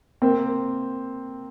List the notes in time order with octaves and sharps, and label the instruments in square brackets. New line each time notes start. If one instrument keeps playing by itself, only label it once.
[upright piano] A#3 C4